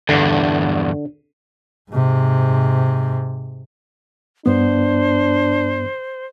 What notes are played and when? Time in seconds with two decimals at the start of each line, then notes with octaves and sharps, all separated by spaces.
0.09 E2 G2 D3 D4
1.91 G#2 C3
4.46 G2 B3 D4 C5